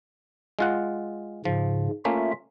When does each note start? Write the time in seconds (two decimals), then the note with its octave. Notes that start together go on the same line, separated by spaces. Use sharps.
0.59 G#3 F4 F#5
1.45 G#2 C#3 F3
2.05 A3 A#3 C#4 F4 E5